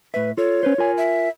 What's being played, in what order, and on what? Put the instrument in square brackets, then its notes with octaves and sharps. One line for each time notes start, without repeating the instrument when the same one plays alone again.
[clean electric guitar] A2 E5 [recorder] B4
[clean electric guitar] F4 A4 [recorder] C#5
[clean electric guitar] C#4 B4 C5
F4 A#4 G#5
[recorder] E5